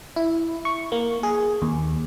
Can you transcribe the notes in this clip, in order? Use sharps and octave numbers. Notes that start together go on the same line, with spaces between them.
E4
C#6
A#3
G#4
D#2